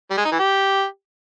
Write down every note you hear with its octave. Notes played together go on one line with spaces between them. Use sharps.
G3
G#3
D#4
E3
G4